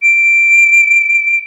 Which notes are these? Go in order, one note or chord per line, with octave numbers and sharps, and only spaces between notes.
D7